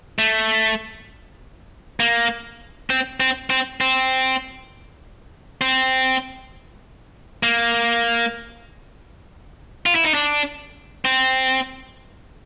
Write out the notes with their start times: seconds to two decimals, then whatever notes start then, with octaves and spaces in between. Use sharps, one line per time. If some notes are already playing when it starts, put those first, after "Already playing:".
0.19 A3
2.00 A#3
2.90 C4
3.20 C4
3.50 C4
3.81 C4
5.61 C4
7.43 A#3
9.86 F4
9.95 E4
10.04 D#4
10.14 D4
11.05 C4